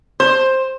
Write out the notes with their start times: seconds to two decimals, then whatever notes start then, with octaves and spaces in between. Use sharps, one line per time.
0.20 C5